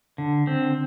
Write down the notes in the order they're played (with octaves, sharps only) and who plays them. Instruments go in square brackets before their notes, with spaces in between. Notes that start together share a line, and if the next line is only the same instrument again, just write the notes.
[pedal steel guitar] D3
C4